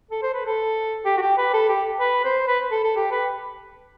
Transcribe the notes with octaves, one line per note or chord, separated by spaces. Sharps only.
A4
C5
B4
A4
G4
F#4
G4
B4
A4
G4
B4
C5
B4
A4
A4
G4
B4